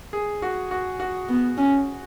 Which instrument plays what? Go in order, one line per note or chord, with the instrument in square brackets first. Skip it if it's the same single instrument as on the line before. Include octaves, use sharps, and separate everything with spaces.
[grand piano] G#4
F#4
F#4
F#4
[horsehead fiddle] B3
C#4